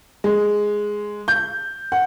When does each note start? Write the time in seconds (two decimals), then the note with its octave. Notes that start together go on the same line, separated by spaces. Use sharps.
0.24 G#3
1.28 G6
1.92 F#5